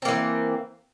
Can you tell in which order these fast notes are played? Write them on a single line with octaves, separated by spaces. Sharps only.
C4 A#3 E3